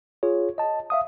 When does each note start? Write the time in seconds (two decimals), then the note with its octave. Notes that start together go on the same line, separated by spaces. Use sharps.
0.23 F4 G#4 C#5
0.58 D#5 A5
0.90 E5 F5 D#6